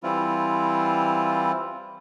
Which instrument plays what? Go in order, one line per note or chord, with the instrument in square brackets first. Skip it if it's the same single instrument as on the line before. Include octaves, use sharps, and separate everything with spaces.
[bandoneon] E3 G3 C4 E4 F4